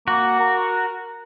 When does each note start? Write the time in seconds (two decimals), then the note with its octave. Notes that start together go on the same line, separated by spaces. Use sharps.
0.08 A#3 F#4
0.39 A#4